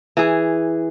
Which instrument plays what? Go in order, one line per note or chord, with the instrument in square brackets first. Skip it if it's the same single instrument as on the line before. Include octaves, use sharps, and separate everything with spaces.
[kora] E3 G#4